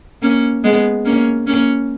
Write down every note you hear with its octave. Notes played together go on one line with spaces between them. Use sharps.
A#3 C#4
G#3 B3
A#3 C#4
A#3 C#4